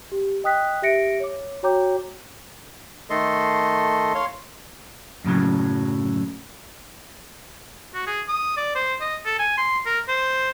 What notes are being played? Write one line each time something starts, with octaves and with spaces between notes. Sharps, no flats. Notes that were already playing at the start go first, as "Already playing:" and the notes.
G4
D#5 G5 D#6 F#6 B6
G4 E5 A#6 C#7 D7
C#5 D6
F#4 C#5 G5 A#5 D6 G6
D#3 A3 A4 D#5 C6
C#5 F5 C6
F#2 A2 C#3 F#3
F#4
G#4
D#6
D5
C5
D#5
A4
G#5
C6
A#4
C5